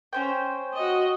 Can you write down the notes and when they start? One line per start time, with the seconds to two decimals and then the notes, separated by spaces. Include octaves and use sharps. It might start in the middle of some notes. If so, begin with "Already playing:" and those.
0.13 C#4 C5 G5
0.74 F#4 D#5